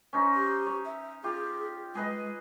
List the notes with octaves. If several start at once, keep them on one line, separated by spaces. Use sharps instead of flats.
C#4 D#4 C5
G4
C#5
E5
F4 G4 G#4
G#3 G#4 B4 D#5